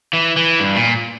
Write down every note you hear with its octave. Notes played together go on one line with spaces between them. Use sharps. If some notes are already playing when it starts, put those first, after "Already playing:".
E3
E3
G2
A#2